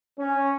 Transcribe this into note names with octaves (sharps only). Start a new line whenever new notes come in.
C#4